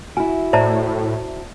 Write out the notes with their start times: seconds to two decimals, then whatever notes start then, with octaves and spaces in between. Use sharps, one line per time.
0.17 E4 F#4 G#5
0.53 A2 C5 D5 E5 A5 A#5